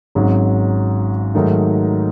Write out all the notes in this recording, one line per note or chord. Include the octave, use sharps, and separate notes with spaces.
G#1 G#2 F#3 C#4
G#2 D#3 F#3 A3 D#4